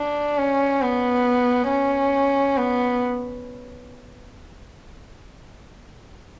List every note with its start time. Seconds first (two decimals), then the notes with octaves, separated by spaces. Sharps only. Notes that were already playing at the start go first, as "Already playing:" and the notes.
Already playing: D4
0.38 C#4
0.81 B3
1.70 C#4
2.57 B3